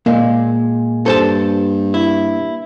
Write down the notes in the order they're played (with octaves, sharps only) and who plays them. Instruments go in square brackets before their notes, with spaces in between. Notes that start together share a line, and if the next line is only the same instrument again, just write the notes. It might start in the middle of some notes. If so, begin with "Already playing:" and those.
[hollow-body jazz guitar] A#2 G#3 [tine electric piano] A#3
[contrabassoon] G2 [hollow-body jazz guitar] A4 C5 A5
[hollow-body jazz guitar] E4